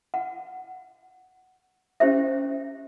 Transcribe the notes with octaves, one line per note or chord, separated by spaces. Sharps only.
F#5
C#4 G4 C5 E5